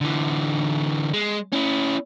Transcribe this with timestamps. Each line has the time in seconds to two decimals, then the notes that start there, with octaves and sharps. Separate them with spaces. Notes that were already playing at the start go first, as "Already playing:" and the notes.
0.01 D3 E3
1.13 G#3
1.53 C#4 E4